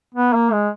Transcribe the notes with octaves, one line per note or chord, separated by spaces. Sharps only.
B3
A#3
G#3